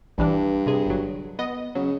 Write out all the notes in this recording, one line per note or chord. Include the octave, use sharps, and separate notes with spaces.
A#1 G2 E3 D4
C3 G#4
G1 F#3
B3 D#5
C#3 F#3